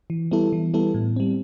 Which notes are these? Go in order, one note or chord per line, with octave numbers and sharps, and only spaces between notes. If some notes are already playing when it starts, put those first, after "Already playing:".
E3
G3 B3 E4 A4
E3
G3 B3 E4 A4
A2
G3 C4